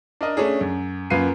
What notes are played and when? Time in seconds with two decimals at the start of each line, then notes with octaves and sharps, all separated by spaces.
0.21 D4 A#4 D#5
0.37 A3 C#4 D4 G#4
0.61 F#2
1.10 F#2 A#3 F4 B4 C7 D#7